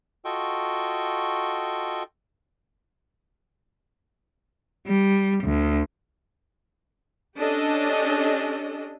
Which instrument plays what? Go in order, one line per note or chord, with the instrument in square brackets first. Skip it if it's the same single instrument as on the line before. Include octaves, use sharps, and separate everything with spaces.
[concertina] F4 F#4 A4 D#5 G5 C#6
[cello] G3
D2
[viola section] C#4 D4 G4 A4 D#5